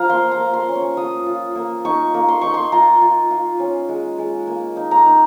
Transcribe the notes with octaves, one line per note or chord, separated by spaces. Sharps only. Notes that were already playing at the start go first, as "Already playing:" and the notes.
Already playing: F3 F5 A#5
A#3 C6
A#5
A#3
C6
C#4
C#6
F4 D#6
F4
A#3
D#4 C#6
A#3
C6
D#4 C#6
C6
F4 A#5
F4
F4
C#4
G#3
G#3
A#3
D#4
A#5
D#4